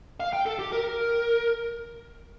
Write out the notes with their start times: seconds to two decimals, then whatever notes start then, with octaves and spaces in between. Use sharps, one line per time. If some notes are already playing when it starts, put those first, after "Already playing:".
0.20 F5
0.33 G5
0.46 A4
0.59 G4
0.72 A#4